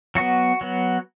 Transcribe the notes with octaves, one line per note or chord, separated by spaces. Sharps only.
F#3 B3 F#4
F#3 B3